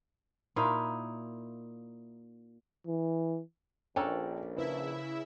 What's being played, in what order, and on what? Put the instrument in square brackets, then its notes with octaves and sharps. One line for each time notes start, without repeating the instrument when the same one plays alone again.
[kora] A#2 D#4 E4 F5
[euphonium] E3
[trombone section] A#1 [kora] C#4 D4 A4 [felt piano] G5 A#5
[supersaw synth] C#3 E4 E5 [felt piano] B4